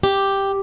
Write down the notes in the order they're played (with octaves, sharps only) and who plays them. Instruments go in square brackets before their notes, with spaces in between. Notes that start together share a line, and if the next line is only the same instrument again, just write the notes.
[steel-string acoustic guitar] G4